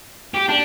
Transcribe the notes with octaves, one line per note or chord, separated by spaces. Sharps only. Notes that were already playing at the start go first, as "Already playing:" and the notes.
G4
D4